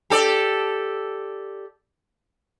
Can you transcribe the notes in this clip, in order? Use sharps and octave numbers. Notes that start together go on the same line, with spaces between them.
G4 A4 D5